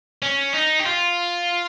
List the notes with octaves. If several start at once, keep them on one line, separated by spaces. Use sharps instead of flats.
C#4
D#4
G4
F4